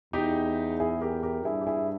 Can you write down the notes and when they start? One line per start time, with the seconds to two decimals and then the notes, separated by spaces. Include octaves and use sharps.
0.13 E2 D#4 G4
0.80 E4 G#4
1.01 G4 A#4
1.23 G4 A#4
1.45 G2 E4 G#4
1.61 G4
1.67 E4 G#4